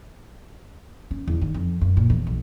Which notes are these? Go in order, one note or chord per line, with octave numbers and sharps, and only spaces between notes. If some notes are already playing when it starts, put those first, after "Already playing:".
C#4
E2
D#3
F2
F#2
A#2
E2
B1